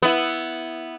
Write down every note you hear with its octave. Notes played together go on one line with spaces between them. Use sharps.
B3 E4